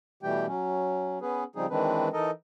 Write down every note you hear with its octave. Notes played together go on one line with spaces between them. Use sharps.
B2 E3 G3 A3 G4 G5
F#3 C#4
B3 C#4 G#4 B4
C#3 F3 G3 C4 D#4 G#4
D#3 E3 G#3 C4 D4 B4
E3 D#4 A4 A#4 D#5